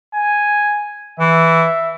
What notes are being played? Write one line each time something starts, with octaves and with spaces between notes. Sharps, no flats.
G#5
E3 E5